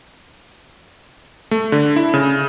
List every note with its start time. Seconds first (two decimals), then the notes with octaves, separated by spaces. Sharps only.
1.51 A3
1.72 D3
1.96 E4
2.14 C#3